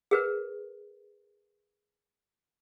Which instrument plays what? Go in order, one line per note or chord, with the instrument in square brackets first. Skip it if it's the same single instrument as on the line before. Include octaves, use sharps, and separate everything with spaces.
[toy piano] G#4 A#4 B4